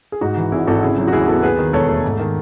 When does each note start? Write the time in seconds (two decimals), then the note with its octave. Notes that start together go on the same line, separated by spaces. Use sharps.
0.12 G#4
0.21 G#2 D#4 F#4
0.37 E3
0.52 G#1 E4 G#4
0.67 G#1 F#4 A4
0.82 C#3 E4 G#4
0.98 F#3
1.08 F#4
1.13 D#2 E4 G#4
1.28 B3 F#4 A4
1.43 D#2 G#4 B4
1.59 D#3
1.73 E1 A4 C#5
1.89 A3
2.04 G#2
2.19 D#3